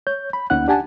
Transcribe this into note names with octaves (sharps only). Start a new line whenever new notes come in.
C#5 G6
B5
D2 A#3 C#4 D#4 F#5 F#6
D4 G4 F#5 G#5 A5